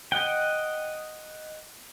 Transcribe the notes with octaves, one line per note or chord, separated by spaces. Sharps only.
D#5 F#5 G5